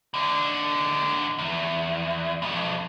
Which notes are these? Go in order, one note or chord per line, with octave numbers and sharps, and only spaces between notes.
D#2 D3
E2
B1 F2